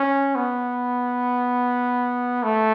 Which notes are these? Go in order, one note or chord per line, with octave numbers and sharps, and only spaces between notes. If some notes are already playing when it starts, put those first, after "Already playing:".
Already playing: C#4
B3
A3